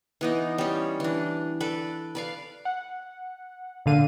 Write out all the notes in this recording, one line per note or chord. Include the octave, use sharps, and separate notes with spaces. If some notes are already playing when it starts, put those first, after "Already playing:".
E3 B3 D#4
G3 C#4
E3 D4
A4 B4 D5
B4 D5 F5
F#5
A#2 D3 F5 D#7